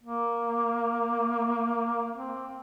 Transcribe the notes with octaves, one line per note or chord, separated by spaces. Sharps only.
A#3
C4